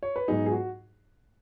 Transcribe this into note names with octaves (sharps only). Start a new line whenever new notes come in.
C#5
B4
G#2 F#3 B3 D#4 G#4
G#4
F#4